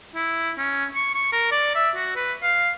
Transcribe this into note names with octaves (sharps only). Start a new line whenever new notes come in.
E4
C#4
C#6
C#6
A#4
D5
E5
F#4
B4
F5